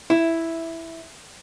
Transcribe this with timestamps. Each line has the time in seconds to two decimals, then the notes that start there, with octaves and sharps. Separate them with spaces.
0.10 E4